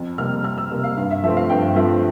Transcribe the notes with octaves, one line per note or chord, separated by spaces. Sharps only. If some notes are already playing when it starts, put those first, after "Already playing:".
Already playing: F2
C3 G3 A#3 F6
F2 F6
E6
C3 G3 A#3
F5
G2 F5
E5
F3 A3 C4 E5
F5
G2 G5
F3 A3 C4 E5